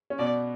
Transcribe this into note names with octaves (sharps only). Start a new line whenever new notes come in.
C#4
B2 B3 D5